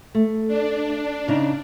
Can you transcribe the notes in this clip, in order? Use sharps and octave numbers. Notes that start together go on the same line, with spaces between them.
A3
D4
C#3 D#4